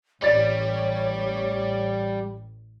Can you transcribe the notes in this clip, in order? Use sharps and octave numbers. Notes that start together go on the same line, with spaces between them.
A1 G3 C#5 D5 A6